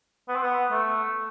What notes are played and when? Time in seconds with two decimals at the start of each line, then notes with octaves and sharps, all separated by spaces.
0.29 B3
0.36 C4
0.42 B3
0.71 A3